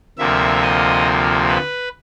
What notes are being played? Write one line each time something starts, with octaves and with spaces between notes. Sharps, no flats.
D2 C3 F3 A#3 E5
D#5
B4